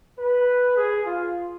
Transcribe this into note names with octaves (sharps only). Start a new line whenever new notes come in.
B4
G#4
F4